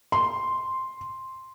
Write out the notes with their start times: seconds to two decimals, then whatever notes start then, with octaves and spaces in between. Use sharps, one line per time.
0.12 C6